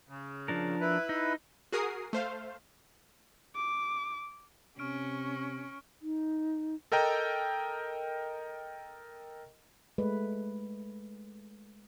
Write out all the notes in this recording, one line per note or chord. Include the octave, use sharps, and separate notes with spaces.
C#3
F3 D4 A#4
E4 B4
D#4
F#4 G#4 A#4 D#6 C7
A3 C5 F5
D6
C3 C#4 C#6 F6 D7
D#4
A4 A#4 D#5 G5 A#5
G#3 A3 B4